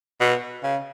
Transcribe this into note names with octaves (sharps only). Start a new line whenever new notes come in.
B2
C#3